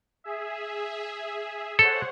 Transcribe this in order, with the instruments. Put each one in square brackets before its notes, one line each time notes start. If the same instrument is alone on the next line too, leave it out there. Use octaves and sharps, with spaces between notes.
[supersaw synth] G#4 E5
[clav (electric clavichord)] A4 [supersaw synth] C5 C#5 F#5